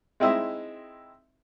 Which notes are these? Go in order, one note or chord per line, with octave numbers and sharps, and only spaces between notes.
G#3 C4 D#4 E4 E5